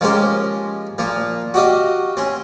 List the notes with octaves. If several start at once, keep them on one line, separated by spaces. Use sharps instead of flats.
F3 G#3 A#3 C#4 G4 C5
A#2 F3 A#3
F#4 G4 D#5 F5
C4 C#4